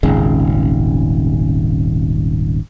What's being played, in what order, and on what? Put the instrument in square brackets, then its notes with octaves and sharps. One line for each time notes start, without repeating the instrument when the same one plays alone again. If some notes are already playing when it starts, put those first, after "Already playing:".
[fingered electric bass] D#1 G#1 C#3 G#3